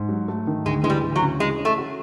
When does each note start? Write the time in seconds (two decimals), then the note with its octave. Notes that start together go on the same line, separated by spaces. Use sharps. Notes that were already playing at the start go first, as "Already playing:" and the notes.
Already playing: G#2
0.09 F#3
0.28 A3
0.47 D#3
0.65 D2 G#3
0.83 E3 G#3
0.90 G3
1.03 D2
1.16 F#3
1.22 C#3
1.40 E3 G#3
1.59 C#4
1.65 A3
1.78 F#4